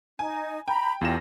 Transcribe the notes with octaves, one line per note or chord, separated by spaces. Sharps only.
D#4 G#5
G5 A#5 B5
E2 F4 G4 A4 A#6 E7